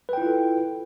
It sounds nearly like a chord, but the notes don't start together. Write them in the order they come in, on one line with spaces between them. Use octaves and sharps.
B4 G5 E4 F4 A4